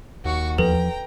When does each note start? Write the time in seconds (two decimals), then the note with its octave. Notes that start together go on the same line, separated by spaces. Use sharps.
0.25 D#2 F#4 C#6
0.58 E2 F3 A4 B4 G5 A#5